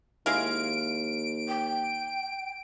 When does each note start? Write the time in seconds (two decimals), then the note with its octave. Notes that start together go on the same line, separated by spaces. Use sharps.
0.26 D#2 G#3 E4 F5 D7
1.48 G5